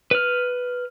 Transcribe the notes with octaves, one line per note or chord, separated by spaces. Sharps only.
B4 F6